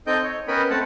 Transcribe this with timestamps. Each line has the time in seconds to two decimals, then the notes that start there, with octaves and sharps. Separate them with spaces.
0.07 C4 D#4 A4 D#5 G5 G6
0.23 C#5
0.48 B3 C#4 A#4 D#5 G5 B5
0.70 A3 C4 F#5 A5